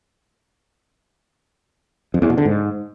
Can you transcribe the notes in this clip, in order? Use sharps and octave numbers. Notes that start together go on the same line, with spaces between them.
F2
E2
B2
D3
G#2